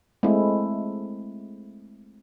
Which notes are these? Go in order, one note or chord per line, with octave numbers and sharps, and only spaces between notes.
G#3 A3 C4 E4